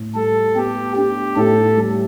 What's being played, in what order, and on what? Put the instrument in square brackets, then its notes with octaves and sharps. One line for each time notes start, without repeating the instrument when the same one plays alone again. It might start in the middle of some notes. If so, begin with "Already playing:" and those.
Already playing: [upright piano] A2
[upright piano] G3 [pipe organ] A4
[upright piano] B3 [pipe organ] G4
[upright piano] D4 [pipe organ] G4
[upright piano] A2 [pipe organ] A4
[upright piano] G3